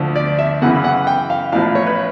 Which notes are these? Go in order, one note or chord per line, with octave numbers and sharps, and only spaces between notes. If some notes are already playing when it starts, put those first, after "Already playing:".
Already playing: D2 D3 F3
D5
E5
F#2 C#3 E3 F#5
F#5
G5
F5
A1 A2 F3 F5
C#5
B4